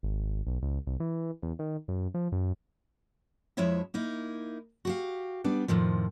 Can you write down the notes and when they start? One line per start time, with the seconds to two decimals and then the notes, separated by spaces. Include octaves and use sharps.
0.03 G#1
0.47 B1
0.62 C#2
0.87 C2
1.00 E3
1.43 E2
1.59 D#3
1.88 F#2
2.14 F3
2.32 F#2
3.57 F2 F3 G#3 E4 C#5 E5
3.94 A#3 D#4 E4
4.85 F#4 G4 F5
5.44 G3 B3 D4
5.68 F2 A2 D#3 F3